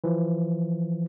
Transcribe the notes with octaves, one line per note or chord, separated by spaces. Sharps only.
E3 F3